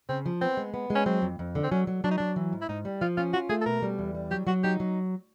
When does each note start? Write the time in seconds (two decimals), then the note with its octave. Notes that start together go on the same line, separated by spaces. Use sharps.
0.09 C#3 C4
0.26 F3
0.41 B3 C4
0.57 G#3
0.74 B3
0.90 G#3
0.95 C#4
1.06 F#3 C4
1.22 F2
1.39 F2
1.55 D3
1.63 C4
1.71 F#3 C#4
1.87 F#3
2.04 F#3 D4
2.11 D#4
2.18 F#3 D4
2.36 E3
2.52 G#2
2.61 E4
2.69 G#2 D#4
2.85 G3
3.01 F3 F4
3.17 C#4 F4
3.33 F4 F#4
3.49 A3 G#4
3.61 A4
3.66 B2 A#4
3.82 G3
3.99 E2
4.15 G3
4.31 F#3 G4
4.47 F#3 F#4
4.63 D#4 G4
4.80 F#3